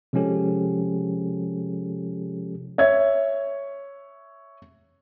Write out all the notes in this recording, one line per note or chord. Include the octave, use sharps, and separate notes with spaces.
C3 F3 G#3 C#4 G4 A4
C#5 E5 G#6